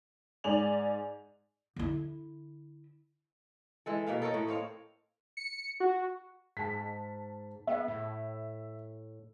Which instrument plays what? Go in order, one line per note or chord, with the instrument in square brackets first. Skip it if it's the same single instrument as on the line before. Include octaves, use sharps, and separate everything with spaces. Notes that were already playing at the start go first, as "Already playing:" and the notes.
[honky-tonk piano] G#2 D5 G#5 F7 F#7
[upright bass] D3 E4
[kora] E3 G#3 A4
B2 A#3 B3 F5
A4 A#4 C#5 D#5
A2
A#3 C4 C#5 F5
[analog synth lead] C#7
F#4
[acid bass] G#2 [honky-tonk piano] A5 B6
[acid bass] B3 [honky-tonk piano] E5
[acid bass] A2